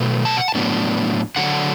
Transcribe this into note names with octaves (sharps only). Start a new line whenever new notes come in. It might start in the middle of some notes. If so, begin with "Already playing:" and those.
Already playing: B2 F#3 A3
A5
F#5
A5
A2 F#3 B3 D4
D3 F#3 D4 F#5